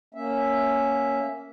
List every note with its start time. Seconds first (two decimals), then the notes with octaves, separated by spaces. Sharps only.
0.14 A#3 C#4 E5